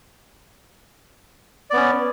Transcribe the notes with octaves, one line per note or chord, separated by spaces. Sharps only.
B3 C#4 D5